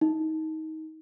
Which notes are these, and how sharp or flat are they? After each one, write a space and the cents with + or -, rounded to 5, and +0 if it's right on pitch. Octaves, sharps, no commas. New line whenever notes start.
D#4 +25